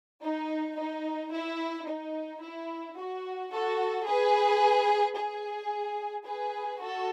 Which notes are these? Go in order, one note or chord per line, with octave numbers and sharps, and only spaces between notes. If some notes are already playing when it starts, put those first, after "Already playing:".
D#4
D#4
E4
D#4
E4
F#4
F#4 A4
G#4 B4
G#4
G#4 B4
F#4 A4